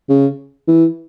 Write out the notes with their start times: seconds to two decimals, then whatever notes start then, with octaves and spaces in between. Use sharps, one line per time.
0.09 C#3
0.68 E3